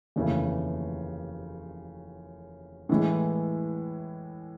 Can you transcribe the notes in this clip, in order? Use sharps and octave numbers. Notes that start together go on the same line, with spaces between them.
F1 D#2 C#3 E3 A3
A2 E3 G#3